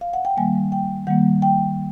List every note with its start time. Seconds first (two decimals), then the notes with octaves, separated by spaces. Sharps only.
0.01 F5
0.13 F#5
0.25 G5
0.37 D#3 G3 A#3 G#5
0.72 G5
1.07 D#3 G3 A#3 F#5
1.42 G5